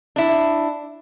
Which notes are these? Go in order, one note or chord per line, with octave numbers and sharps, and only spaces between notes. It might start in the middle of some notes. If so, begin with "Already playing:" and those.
D4 E4